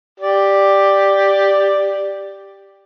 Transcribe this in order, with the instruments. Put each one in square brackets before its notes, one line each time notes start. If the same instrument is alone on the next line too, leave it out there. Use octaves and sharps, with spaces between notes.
[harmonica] G4 D5